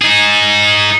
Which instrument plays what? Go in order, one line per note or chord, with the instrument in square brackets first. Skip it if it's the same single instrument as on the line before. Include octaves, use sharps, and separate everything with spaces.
[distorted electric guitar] D#4 G#4